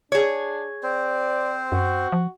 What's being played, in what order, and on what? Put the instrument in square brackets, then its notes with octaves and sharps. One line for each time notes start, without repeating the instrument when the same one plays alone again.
[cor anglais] D4 [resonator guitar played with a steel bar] G#4 C#5
[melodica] C4 C5 [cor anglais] D5
[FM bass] F#2 [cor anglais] F#4
[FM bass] F3